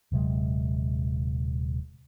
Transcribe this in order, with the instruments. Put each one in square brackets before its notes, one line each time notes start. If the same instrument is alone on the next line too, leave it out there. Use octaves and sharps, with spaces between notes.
[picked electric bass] D#1 C3 F#3 G#3